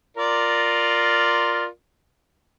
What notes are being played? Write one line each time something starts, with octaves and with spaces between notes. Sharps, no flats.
F4 A#4 D5